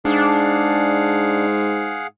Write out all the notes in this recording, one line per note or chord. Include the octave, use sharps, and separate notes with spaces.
G#2 D4 G#4 F5 F#5